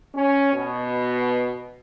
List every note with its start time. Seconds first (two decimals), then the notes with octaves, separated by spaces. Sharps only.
0.14 C#4
0.54 B2